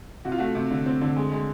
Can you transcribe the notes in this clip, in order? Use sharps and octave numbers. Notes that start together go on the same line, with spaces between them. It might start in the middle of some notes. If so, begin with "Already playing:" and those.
C3 F#4
F4
A3 F#4
C3
D3
C4
D3
G#3
G#3